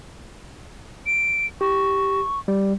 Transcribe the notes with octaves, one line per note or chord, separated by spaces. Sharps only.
D7
G4 C#6
G3